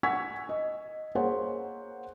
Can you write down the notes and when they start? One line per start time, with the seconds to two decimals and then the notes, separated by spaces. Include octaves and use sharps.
0.03 F#5 G#5 C#6 E6 G#6 B6
0.49 D#5
1.15 A#3 G#4 C5 C#5 F#5